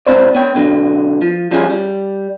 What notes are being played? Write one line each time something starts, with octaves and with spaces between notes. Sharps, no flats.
C#2 G2 B2 C4 C5 D5
B3 C#5 G5
B2 D3 F#3
F3
F3 G3 C#4 G#4
G3